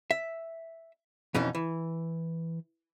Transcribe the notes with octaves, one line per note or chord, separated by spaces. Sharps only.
E5
F2 B2 E3 C#4 D#4
E3